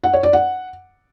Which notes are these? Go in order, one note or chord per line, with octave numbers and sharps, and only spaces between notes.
F#5
C#5
D5
F#5